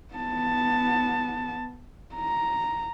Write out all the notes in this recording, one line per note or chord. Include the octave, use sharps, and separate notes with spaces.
B3 A5
A#5